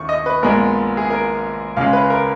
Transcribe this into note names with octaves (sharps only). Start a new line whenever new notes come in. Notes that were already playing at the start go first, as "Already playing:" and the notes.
Already playing: D#2 D#3 C#6
D#5
B4
A#1 A#2 G#3 B3 A#4
G#4
A#4
C#2 C#3 G#3 F5
B4
A#4